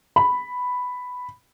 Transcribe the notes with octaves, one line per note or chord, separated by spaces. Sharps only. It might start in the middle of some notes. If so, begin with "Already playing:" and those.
B5